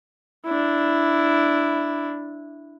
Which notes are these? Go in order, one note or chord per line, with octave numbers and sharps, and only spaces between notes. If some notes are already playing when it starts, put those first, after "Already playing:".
D4 E4